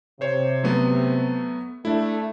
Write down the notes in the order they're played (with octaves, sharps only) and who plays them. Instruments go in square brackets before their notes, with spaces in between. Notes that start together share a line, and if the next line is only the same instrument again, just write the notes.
[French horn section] C3 [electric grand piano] C5 C#5
[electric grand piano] F#3 A3 B3
[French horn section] A3 [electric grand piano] D4 E4